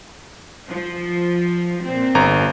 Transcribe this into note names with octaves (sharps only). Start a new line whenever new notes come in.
F3
A#2 C4
G1 A#5